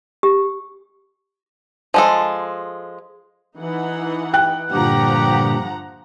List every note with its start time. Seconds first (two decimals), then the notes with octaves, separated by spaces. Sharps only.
0.23 G4
1.94 F3 G#3 A4
3.59 E3 D#4 F#5
4.33 G5 F#6
4.72 G2 A#2 D3 F3 G4 F#5 A#5